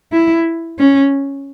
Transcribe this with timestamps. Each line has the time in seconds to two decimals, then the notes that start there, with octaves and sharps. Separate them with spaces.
0.12 E4
0.79 C#4